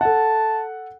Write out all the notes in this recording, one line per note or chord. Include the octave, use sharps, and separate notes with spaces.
A4 F#5 A5